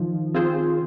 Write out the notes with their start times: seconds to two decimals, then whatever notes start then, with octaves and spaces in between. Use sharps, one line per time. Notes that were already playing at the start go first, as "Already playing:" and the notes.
Already playing: D#3 F3
0.34 C4 F4 G#4 C5